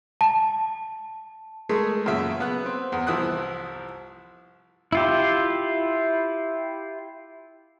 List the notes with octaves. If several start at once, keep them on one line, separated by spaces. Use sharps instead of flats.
A5
G#3 A3 G#4 A#4
F#2 A#2 C#3 E5
B3 F#6
C4
E2
C2 F3 E4 D#6 F#6
E4 F4 G4